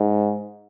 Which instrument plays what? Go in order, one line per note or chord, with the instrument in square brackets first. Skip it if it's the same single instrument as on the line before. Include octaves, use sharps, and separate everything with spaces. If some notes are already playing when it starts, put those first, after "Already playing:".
Already playing: [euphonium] G#2